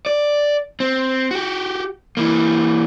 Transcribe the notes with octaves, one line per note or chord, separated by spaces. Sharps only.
D5
C4
F#4 G4
E3 A#3